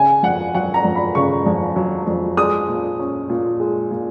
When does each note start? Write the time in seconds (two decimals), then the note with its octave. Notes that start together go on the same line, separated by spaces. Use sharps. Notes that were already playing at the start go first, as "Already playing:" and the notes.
Already playing: C#3 G#5
0.23 F2 F#5
0.54 F#3 F#5
0.74 A#5
0.85 F2
0.95 B5
1.15 C#3 C#6
1.46 F2
1.76 F#3
2.07 F2
2.37 G#3 D#6
2.69 A#2
2.99 C#4
3.30 A#2
3.60 G#3
3.91 A#2